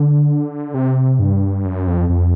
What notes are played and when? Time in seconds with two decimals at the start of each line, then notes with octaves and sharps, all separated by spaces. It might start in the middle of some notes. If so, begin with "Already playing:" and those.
Already playing: D3
0.74 C3
1.19 G2
1.65 F#2
1.87 F2
2.09 F2